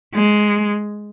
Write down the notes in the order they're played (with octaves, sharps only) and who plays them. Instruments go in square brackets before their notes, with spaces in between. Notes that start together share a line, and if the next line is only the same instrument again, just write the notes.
[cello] G#3